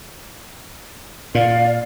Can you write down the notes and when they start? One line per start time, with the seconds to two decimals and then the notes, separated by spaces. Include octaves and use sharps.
1.35 A#2 D5 F5